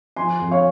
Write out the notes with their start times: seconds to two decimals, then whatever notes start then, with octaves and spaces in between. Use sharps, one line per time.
0.16 F3 G#5 C6
0.40 F2
0.51 C#5 F5